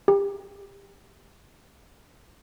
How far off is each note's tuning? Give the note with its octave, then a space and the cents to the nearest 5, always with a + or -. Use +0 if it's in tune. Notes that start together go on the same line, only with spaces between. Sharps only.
G4 +25